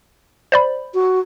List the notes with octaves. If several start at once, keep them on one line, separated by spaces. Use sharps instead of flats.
C5 D5 B5
F#4